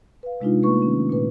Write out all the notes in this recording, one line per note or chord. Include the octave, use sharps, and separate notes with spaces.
B4 F5
C3 G#3 D4 D#4 F4
A3 A#3 B4 C#6
D#3 C#4
A#2 B4